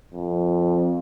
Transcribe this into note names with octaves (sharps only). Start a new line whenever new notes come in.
F2